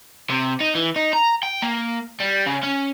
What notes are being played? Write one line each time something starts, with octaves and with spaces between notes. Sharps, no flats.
C3
D#4
E3
D#4
A#5
G5
A#3
G3
C#3
C#4